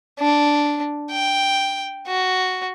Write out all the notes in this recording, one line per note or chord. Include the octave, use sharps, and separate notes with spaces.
D4
G5
F#4